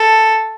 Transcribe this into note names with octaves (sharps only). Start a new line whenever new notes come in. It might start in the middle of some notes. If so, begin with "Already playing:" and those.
Already playing: A4